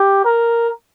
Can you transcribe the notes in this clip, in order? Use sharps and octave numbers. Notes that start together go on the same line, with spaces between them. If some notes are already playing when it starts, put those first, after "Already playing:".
Already playing: G4
A#4